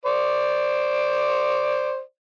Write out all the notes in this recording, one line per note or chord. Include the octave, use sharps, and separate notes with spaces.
C5 D5